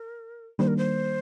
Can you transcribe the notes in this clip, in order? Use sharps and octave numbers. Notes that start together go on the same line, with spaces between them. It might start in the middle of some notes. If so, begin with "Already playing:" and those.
Already playing: A#4
D#3 G3 A#3 D4 C5
A#4
C5